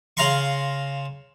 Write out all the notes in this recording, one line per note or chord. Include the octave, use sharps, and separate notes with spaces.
C#3 F5 A#5 C6 C#6